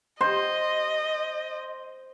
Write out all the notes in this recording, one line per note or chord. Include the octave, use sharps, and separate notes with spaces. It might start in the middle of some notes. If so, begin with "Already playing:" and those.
C5 D#5